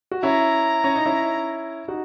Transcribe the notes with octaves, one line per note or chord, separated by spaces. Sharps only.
F#4
C#4 E4 A#5
C#4
D#4
C#4 E4
D#4 F#4